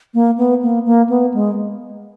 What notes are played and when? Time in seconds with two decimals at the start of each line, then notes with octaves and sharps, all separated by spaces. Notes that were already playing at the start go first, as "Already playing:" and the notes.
0.14 A#3
0.38 B3
0.62 A#3
0.85 A#3
1.09 B3
1.34 G#3